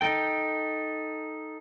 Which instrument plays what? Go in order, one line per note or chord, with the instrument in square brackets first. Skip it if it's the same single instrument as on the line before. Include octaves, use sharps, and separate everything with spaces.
[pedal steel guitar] D#4 A4 G5